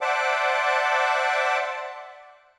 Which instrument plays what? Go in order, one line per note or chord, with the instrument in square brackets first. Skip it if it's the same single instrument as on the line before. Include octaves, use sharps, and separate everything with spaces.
[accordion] C5 D5 E5 F#5 A5 D6